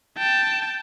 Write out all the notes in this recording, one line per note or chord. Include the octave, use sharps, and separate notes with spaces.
G5 A5